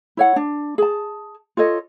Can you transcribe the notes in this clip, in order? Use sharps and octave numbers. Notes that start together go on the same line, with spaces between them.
E4 C#5 F#5
D4
G#4 A5
F4 A4 C#5 D#5